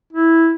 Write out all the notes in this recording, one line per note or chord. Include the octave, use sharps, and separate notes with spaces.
E4